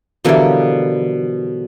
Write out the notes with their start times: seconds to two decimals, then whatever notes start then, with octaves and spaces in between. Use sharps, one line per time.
0.24 B2 D3 E3 F3 G3 A#3